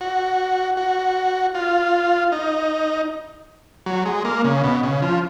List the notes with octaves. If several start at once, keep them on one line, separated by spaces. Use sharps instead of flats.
F#4
F#4
F4
D#4
F#3
G#3
A#3
C#3
B2
C#3
F3